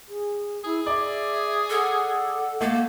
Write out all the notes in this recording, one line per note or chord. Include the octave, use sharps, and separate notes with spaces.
G#4
E4 G#4
D5 E5
A4 F#5
A3 A#3